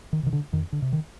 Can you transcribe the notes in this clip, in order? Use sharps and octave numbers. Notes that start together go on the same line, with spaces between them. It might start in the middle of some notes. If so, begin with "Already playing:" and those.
D#3
C3 D#3
D3
F2 D#3
D3
C3
D#3